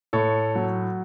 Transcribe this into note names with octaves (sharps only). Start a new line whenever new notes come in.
A2 A4 C#5
F#3